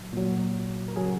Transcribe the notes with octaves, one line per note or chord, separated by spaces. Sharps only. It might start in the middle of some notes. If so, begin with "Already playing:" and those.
Already playing: A#2 F#3
A#2 F#3
A#4
C#3 F#3 G#4